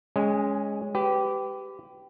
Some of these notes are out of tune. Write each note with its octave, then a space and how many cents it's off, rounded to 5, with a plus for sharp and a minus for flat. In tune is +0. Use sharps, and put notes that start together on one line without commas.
G#3 +0 C#4 +5 G#5 -40
G4 -10 B4 +25